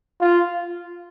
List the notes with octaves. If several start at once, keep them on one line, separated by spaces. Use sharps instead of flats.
F4